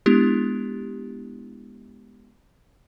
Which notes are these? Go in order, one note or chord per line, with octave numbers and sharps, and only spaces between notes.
G#3 B3 D4 E4 G4